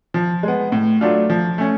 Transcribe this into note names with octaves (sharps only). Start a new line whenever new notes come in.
F3
G#3 B3
A2
F#3 A3 D4 F4
F3
A3 C#4